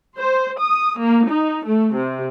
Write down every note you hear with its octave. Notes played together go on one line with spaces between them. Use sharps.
C5
D#6
A#3
D#4
A3
C3